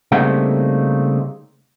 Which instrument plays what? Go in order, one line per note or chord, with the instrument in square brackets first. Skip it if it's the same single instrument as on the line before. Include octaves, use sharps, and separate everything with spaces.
[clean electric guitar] C#3 G3 A3 A#3 C4 D#4